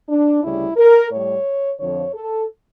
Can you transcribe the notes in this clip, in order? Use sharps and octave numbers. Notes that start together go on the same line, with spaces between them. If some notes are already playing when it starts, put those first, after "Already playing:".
D4
D2 C#3 G3 E4
A#4
A2 G3 C#5
F2 D3 F3 C#5
A4